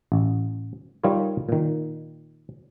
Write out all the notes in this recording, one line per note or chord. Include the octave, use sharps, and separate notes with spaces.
A1
G3 D#4 F4 A#4 C#5
A#2 D#3